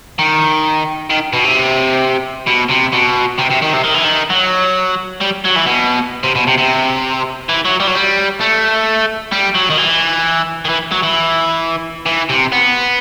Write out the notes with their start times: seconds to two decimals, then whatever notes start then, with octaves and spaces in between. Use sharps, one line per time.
0.19 D#3
1.10 D#3
1.33 B2
1.44 C3
2.47 B2
2.70 C3
2.93 B2
3.38 C3
3.50 C3
3.62 D#3
3.73 C3
3.84 D#3
3.94 E3
4.04 D#3
4.30 F#3
5.21 G3
5.44 F#3
5.56 E3
5.66 B2
6.23 C3
6.35 B2
6.47 C3
6.58 C3
7.49 E3
7.65 F#3
7.80 G3
7.87 F#3
7.95 G3
8.40 A3
9.32 G3
9.55 F#3
9.70 D#3
9.78 E3
10.65 D#3
10.69 E3
10.92 F#3
11.03 E3
12.06 E3
12.29 C3
12.52 B3